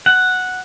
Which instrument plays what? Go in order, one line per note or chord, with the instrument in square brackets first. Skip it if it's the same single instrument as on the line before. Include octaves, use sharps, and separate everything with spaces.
[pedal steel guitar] F#5